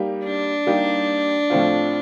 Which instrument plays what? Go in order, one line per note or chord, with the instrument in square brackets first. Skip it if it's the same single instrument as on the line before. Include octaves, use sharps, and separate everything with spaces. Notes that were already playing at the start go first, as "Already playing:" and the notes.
Already playing: [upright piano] G3 A#3 D#4 G4
[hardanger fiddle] D4
[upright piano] G3 A#3 D#4 G4
A2 F3 A3 C4 F4